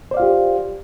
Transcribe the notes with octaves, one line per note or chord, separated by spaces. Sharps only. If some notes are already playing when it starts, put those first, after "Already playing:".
F4 G4 C5 D5 F5